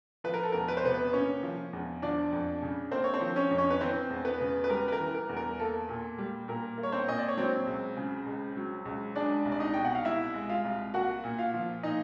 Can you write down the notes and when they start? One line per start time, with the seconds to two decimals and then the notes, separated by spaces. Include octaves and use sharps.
0.24 F3 B4
0.34 A#4
0.43 A4
0.52 E2 A#4
0.68 B4
0.77 C5
0.84 C3 B3 B4
1.13 A#3 C#4 C#5
1.43 F3
1.73 E2
2.02 F3 D4 D5
2.32 F2
2.62 C#3
2.91 A#3 C4 C5
3.04 C#5
3.14 C4 C5
3.21 F3
3.36 C#4 C#5
3.51 F2
3.58 C#4 C#5
3.70 B4
3.80 E3 C4 C5
4.10 E2
4.25 B3 B4
4.40 C#3
4.64 B4
4.70 G3 A#4
4.88 B4
4.92 A#4
5.00 E3
5.15 A#4
5.29 E2
5.37 A#4
5.59 A#3 A4
5.89 A#2
6.18 G3
6.48 A#2 A#4
6.78 A#3
6.83 C#5
6.92 C4 C5
7.08 A#2 D#5
7.18 D5
7.28 C#5
7.37 F#3 C4 C5
7.67 C#2
7.97 C#3
8.26 C#2
8.57 F#3
8.85 C#2
9.15 G#3 D4 D5
9.45 C2
9.52 D5
9.60 D#4 D#5
9.74 B2 G5
9.85 F#5
9.95 F5
10.04 C2 E4 E5
10.34 G#3
10.49 F4 F5
10.65 C2
10.94 A#3 F#4 F#5
11.24 A#2
11.39 F4 F5
11.54 F3
11.83 A#2 D#4 D#5